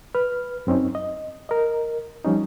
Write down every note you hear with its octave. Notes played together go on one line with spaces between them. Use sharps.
B4 F6
F#2 C4 C#4 D#4
D#5
A#4 D#5
F3 G3 C#4 D#4